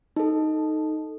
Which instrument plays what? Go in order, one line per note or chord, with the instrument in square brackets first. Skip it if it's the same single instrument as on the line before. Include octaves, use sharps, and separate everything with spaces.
[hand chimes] D#4 A4